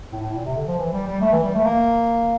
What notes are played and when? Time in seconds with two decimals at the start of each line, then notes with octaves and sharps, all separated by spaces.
0.12 A2
0.23 A2
0.34 A#2
0.45 C3
0.56 D3
0.67 F3
0.78 E3
0.92 G3
1.07 G3
1.21 A3
1.32 E3
1.43 G3
1.54 A3
1.65 A#3